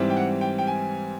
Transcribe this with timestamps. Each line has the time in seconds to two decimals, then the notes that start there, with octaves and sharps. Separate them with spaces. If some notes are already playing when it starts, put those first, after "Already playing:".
Already playing: G#2 E3 G3 C4
0.10 G5
0.16 F#5
0.41 G5
0.58 G5
0.67 G#5